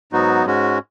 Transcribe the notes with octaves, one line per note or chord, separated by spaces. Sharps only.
G#2 F#3 B3 D#4 F#4
G#2 G#3 C#4 F#4